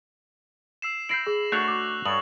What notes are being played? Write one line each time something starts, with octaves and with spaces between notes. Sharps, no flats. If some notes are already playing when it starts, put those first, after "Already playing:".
E6 C7 E7
E4 G6 A#6 C7 D7 F#7
G#4
A3 D4 F#4 C#5 E6 F#6 F7 F#7
C#6 D6
G2 A4 C#5 D#6 F#7